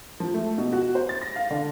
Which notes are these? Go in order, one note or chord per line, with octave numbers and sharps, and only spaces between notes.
F3
A3
B2
F#4
C5
A6
A#6
F5
D3